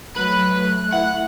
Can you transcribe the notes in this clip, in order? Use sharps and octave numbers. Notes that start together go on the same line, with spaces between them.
F#3 A3 B4 F#6
A3
E4 F#5